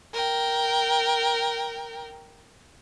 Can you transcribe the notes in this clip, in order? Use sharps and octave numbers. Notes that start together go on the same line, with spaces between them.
A#4 G5